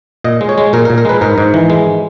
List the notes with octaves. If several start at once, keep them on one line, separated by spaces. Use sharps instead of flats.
A#2 D#5
G#3
C#5
G#3
A#2 A#4
A#4
A#2
A#4
G#3 B4
G#2 A#4
G#2
E3
G#3